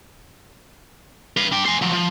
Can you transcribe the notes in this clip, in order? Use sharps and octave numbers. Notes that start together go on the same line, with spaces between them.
B4 F5
D4 G5
C5 G#5
F3 F#3
F3